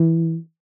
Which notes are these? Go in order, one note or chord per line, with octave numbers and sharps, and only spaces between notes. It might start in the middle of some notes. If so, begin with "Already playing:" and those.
Already playing: E3